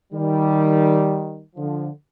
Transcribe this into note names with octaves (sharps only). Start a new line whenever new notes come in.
D#3 G3
D3 F3